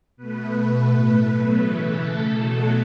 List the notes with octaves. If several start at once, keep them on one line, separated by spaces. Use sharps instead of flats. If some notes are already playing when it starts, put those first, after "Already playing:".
B2 A3 B4
B2 A3 B4
A2 A3
B2 F#3 A3
C#3 E3 A3
C#3 E3 A3 A4
B2 F#3 A3